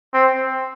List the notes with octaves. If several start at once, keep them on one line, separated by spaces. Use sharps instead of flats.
C4